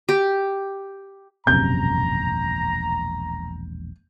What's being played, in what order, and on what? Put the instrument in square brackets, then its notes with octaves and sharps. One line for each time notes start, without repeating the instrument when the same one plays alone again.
[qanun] G4
[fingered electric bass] E1 A#1 [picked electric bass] F#2 C3 [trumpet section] A#5 [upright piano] G6